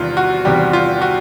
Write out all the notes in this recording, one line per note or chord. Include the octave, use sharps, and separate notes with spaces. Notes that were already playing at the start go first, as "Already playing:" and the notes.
Already playing: E2 C3 D#3 G3 F4
F#4
E2 C3 D#3 G3 G4
F4
F#4